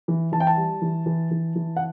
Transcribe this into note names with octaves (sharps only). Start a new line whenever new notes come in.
E3
E3 A5
G5
A5
G3
E3
E3
E3
E3
F#5